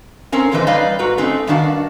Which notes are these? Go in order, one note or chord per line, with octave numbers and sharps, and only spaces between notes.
C4 C#4 A#4
A#2 D3 E3 B4 C5 D#5
G3 D#4 B4 D5 D#5 F5
G#2 F#4 B4 A#5
A3 C4 C#4 D#4
G2 D#3 D4 F#4 F5